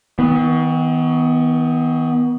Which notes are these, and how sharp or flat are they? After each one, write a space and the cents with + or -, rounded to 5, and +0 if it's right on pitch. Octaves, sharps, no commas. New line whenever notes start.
D#3 +45 B3 +0